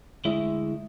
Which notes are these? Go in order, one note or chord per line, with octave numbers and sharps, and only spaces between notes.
D2 G#3 E4 D#5 E5